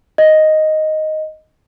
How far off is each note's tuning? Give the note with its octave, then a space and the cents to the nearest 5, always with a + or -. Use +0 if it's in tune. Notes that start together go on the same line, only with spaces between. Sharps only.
D#5 +0